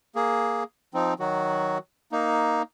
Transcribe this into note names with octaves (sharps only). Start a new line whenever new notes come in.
A#3 G#4
F3 C4 D#4
D#3 F#3 F#4
A#3 D#4